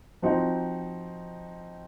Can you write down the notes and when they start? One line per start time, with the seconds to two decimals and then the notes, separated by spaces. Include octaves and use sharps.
0.22 F3 C4 D#4 F#4